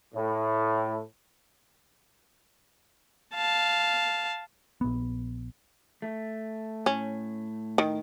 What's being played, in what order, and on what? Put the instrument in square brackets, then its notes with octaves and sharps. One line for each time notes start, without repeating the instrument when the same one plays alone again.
[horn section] A2
[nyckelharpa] F5 A5
[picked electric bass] A#1 B3
[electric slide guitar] A3
[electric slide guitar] A2 [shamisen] C#4
[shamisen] D#3